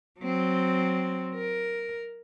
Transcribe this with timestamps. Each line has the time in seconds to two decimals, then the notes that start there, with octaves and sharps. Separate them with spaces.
0.20 F#3 C4
1.35 A#4